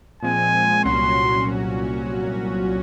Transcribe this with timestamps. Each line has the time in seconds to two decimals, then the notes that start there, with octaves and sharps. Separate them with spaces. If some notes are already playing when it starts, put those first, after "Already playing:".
0.23 A#2 F3 G#3 C4 G#5
0.84 C2 A#2 F#3 C#4 F#4 C6